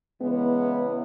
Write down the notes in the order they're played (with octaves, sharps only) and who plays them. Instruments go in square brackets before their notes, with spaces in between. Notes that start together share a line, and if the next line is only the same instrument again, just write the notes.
[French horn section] E2 C#3 E3 G#3 B3